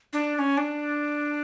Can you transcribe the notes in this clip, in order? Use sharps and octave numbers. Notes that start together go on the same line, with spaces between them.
D4
D4
C#4
D4